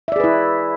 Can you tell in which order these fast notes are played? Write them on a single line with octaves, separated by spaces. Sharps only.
E5 D5 G#4 B4 E4